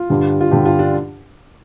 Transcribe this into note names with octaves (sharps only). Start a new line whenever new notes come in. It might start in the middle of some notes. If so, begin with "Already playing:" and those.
Already playing: F4
G2 D3 G3
F4
G2 D3 G3 G4
F4
D4